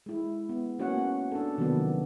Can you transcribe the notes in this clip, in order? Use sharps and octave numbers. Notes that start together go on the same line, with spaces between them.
G#3 E4
B3
A#3 C#4 F#4 C#5 F#5
D4 A4
C3 D#3 F3 F#3 A#3 B3